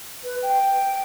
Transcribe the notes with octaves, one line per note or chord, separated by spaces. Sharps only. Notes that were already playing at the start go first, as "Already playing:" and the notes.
B4
G5